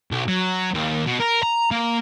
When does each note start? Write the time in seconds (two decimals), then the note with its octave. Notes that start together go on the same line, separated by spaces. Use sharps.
0.11 B1
0.28 F#3
0.74 D#2
1.07 B2
1.20 A#4
1.43 A#5
1.71 A#3